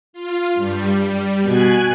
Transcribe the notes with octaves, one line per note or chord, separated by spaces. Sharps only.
F4
G2 G3
B2 G#5 F#6 G#6